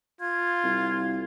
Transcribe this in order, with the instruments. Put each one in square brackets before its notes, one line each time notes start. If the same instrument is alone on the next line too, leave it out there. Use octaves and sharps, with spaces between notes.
[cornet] F4 [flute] G#6
[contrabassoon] C2